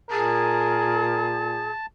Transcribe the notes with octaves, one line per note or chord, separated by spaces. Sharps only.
A#2 G#4 A#4 A5